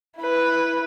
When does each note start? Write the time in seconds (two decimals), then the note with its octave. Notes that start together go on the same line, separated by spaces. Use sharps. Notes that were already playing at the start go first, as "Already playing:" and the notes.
0.18 E4 B4